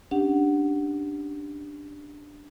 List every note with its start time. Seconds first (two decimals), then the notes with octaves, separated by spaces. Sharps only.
0.11 C#4 D4 G4 F#5